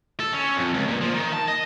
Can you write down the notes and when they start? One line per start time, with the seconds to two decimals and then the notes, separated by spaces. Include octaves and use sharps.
0.20 A4
0.33 C#4
0.56 F2
0.74 C#2
0.88 A#2
1.01 F3
1.14 D#3
1.33 A5
1.48 D#5